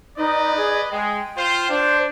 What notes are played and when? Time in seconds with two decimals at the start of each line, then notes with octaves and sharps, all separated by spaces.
0.17 D#4 B4 D5 D#5
0.57 G#4
0.92 G#3 G5
1.37 F4 C5
1.70 D4 C5